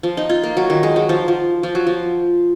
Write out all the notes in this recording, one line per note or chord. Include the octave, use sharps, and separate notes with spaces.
F3
D#4
F4
A#3
F#3
D#3
G#3
F#3
F3
F3
F3
F#3
F3